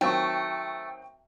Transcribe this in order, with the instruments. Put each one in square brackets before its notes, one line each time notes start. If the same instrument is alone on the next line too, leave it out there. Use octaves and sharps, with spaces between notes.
[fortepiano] D#3 F#3 C4 [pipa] A3 [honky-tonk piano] G5 C#6